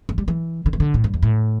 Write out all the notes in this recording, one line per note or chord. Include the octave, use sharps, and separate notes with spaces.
E3
G3
E3
D3
E3
D3
A2
G2
E2
A2